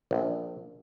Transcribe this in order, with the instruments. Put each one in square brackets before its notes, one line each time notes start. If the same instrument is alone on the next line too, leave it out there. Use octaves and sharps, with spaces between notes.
[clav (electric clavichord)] A#1